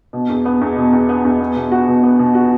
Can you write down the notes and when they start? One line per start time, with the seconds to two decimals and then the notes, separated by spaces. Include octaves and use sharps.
0.13 B2
0.29 E2
0.45 B3
0.61 E2
0.77 B2
0.93 E2
1.09 B3
1.25 E2
1.40 B3
1.56 B2
1.72 F#4
1.88 B2
2.03 B3
2.19 B2
2.35 F#4